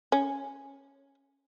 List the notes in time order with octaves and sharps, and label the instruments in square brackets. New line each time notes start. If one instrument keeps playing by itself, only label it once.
[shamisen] C#4